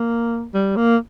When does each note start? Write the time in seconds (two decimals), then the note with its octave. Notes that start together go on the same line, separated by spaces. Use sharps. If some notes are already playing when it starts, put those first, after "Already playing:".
Already playing: A#3
0.54 G3
0.77 A#3